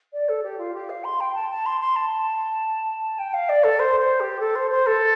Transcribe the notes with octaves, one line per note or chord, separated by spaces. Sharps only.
D5
A4
G4
F4
G4
F5
C6
G5
A5
A5
C6
C6
A5
G5
F5
D5
A4
C5
C5
G4
A4
C5
C5
A4